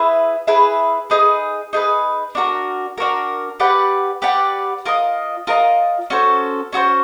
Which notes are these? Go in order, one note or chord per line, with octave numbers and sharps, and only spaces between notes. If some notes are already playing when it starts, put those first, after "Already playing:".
Already playing: E4 G#4 B4 E5
E4 G#4 B4 E5
D#4 G#4 B4
D#4 G#4 B4
D4 F#4 A#4
D4 F#4 A#4
G4 B4 D5 F#5
G4 B4 D5 F#5
F4 A#4 D#5
F4 A#4 D#5
C#4 F#4 A4 C5
C#4 F#4 A4 C5